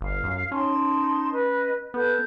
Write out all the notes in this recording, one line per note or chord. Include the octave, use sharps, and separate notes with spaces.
G1 F5
F#2
C#4 D#4 A5 C6
B4 D#5
B3 A4 B4 G6